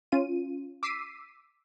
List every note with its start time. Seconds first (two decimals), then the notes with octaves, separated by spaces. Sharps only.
0.12 C#4 F4 D#7
0.83 D6 E6 B6 C7 D#7